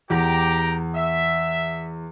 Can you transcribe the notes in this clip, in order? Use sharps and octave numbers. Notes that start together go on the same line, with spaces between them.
E2 G4 A#5
E5